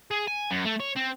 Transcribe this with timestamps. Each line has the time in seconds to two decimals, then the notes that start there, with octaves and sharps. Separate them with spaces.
0.11 G#4
0.28 G#5
0.51 F#2
0.65 A3
0.80 C#5
0.96 C4